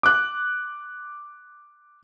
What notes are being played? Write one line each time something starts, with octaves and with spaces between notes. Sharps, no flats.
D6 F#6